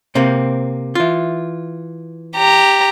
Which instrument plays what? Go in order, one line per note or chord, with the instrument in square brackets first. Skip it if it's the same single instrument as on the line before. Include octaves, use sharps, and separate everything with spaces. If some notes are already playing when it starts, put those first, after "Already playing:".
[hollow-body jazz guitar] C3 A#3 C4
E3 F4
[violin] G4 A#5